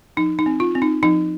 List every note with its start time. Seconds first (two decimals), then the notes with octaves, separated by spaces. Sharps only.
0.17 F3 D#4
0.39 D#4
0.46 C4
0.60 F4
0.75 C4
0.82 D#4
1.03 F3 D#4